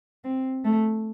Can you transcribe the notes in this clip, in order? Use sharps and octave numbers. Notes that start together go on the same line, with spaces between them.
C4
A3